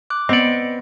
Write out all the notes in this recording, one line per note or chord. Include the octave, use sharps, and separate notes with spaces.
D6 F#6
B3 C4 D5 D#5 C#7